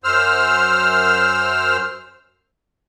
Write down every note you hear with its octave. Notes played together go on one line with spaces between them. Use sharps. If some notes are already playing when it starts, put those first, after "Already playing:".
F#2 C5 E6 F6